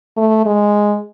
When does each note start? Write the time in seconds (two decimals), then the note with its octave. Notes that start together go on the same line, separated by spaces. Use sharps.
0.17 A3
0.46 G#3